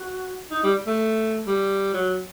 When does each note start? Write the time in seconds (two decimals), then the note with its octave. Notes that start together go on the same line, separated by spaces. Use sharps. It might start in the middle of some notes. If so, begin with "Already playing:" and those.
Already playing: F#4
0.51 D#4
0.63 G3
0.87 A3
1.47 G3
1.94 F#3